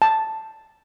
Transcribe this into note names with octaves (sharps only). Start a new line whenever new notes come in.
A5